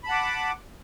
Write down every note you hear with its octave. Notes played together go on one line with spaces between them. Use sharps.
F#5 A5 B5 D6